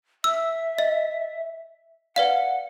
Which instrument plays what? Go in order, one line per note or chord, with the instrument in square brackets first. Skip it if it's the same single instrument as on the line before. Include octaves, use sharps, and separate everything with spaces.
[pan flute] E5 [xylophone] E6
[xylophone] D#5
[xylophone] B4 D5 F5 [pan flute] F#5